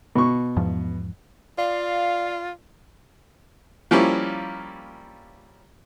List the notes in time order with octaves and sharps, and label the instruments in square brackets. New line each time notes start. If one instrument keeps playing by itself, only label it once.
[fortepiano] B2 C#6
[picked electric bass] E2 G#2 F3
[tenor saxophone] F4 [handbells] D5 [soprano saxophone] F5
[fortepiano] F3 G3 A#3 C#4 E4